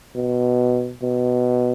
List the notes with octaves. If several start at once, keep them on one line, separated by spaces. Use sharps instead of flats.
B2
B2